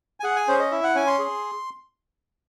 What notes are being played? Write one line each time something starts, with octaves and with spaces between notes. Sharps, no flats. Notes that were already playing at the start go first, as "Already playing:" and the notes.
G#5
G#4 F#5
G#5
C#4 C5
D#5
E4 E5
F#5
C#4 G#5
C6
G#4